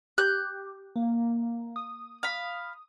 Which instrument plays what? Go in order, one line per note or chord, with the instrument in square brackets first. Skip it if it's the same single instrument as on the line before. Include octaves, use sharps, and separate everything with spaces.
[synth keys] G4 [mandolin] F#6 G6
[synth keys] A#3
D#6
[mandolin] F5 B5